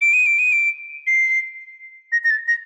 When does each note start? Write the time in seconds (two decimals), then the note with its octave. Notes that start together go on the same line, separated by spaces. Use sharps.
0.01 D7
0.13 D#7
0.26 D7
0.39 D#7
0.52 D7
1.07 C7
2.12 A#6
2.24 A#6
2.30 A6
2.48 A#6